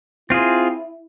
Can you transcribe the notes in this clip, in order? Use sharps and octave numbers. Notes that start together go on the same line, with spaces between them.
C4 E4 F4 G#4